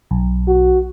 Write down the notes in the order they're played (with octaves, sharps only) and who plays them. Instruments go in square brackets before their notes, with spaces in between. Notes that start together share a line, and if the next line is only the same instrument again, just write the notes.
[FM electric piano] B1
[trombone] F#4